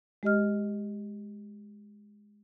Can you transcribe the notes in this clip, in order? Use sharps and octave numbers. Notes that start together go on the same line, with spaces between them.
G#3 G4 D#5 F6